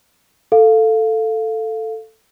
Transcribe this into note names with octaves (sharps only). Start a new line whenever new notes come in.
A4 F5